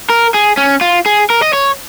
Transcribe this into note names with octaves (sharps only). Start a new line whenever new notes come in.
A#4
G#4
C#4
F4
G#4
A#4
D#5
C#5